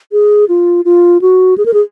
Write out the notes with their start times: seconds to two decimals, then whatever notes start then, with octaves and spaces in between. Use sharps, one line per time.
0.12 G#4
0.49 F4
0.85 F4
1.22 F#4
1.58 G#4
1.66 A#4
1.74 G#4